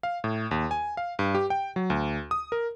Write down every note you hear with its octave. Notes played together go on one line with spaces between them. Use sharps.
F5
A2
D#2
G#5
F5
G2
G4
G5
F#3
D2
D#6
A#4